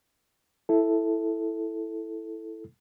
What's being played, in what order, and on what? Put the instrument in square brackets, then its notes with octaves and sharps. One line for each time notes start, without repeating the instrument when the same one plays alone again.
[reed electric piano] E4 A4